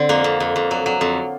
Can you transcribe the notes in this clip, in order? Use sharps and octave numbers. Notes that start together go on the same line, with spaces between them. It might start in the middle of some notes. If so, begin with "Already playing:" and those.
Already playing: D3 C4
F2 A#3
F2
F2
F2
F#3
F#3
F2